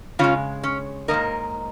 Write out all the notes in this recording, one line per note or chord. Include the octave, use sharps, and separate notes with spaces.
C#3 G#3 C#4 F4
C#4
D#3 A#3 A#4 D#5
G#2